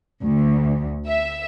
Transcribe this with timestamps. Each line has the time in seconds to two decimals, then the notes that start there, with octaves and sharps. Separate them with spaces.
0.24 D2
1.07 E5